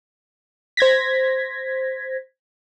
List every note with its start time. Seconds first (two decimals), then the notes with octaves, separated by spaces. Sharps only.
0.77 C5 G#6 A#6 B6